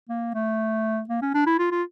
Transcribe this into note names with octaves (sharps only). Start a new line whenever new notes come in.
A#3
A3
A#3
C#4
D4
E4
F4
F4